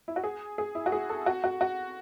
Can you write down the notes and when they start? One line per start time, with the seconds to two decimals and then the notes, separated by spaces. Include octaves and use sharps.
0.08 E4
0.16 F#4
0.24 G#4
0.58 G#4
0.75 E4
0.86 F#4
0.92 G#4
1.09 A4
1.26 F#4
1.44 F#4
1.61 F#4